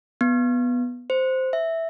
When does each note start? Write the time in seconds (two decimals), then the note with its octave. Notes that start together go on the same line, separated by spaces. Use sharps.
0.21 B3
1.10 C5
1.53 E5